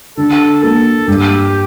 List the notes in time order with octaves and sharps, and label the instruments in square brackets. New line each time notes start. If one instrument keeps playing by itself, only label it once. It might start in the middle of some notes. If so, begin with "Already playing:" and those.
[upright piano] D3 [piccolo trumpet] A4
[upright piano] A#3 [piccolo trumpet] A4
[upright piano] G2 [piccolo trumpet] G4